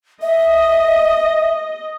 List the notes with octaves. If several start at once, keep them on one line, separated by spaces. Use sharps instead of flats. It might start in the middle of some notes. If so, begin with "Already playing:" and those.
D#5 E5